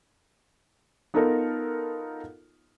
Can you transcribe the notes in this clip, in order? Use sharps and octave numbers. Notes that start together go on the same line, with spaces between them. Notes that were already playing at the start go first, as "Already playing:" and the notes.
B3 D#4 F4 A4 A#4